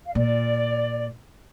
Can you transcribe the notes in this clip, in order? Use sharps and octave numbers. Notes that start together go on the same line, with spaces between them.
F5
A#2 D5